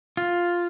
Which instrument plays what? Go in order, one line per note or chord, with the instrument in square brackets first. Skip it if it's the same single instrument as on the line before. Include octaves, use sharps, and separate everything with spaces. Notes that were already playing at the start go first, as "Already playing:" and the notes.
[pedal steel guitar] F4